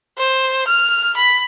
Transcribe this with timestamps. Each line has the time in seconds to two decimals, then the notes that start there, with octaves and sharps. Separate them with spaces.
0.18 C5
0.67 F6
1.17 B5